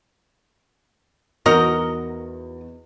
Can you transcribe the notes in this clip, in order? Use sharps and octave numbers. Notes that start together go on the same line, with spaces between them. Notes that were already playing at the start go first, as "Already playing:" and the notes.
E2 D#4 F#4 A#4 D#5